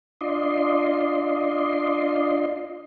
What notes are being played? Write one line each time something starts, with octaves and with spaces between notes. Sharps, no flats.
D4 F4 D5 D#5 C6